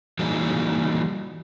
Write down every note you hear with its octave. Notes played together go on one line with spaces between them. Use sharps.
E3 F#3 G3 A#3 D#4 G#4